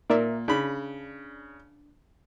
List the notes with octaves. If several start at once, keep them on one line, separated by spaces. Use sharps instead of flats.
A#2 A#4 D5 E5
C#3 D4 B5